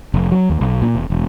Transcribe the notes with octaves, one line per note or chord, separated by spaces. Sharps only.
F1
F#3
D#2
B1
A#2
E1
E1